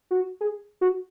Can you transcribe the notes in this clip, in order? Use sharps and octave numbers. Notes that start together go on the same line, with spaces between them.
F#4
G#4
F#4